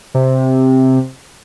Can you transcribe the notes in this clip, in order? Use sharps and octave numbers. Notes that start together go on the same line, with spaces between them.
C3